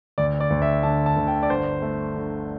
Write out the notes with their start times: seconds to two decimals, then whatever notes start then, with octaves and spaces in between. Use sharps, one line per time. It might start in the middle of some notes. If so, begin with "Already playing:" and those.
0.18 D2 D5
0.40 D5
0.50 D2
0.62 E5
0.83 D3 A5
1.06 A5
1.17 D2
1.28 G5
1.43 D5
1.49 G1 C5
1.82 A3
2.15 D3